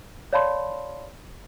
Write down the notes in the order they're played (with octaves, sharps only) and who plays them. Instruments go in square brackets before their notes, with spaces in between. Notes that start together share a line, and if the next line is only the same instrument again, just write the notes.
[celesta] C#5 D5 F5 A5 B5 C6